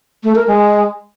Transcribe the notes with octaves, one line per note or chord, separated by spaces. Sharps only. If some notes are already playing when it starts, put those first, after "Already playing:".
A3
A#4
G#3